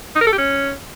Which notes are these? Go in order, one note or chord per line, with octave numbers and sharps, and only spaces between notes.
D#4
A#4
A4
G4
C#4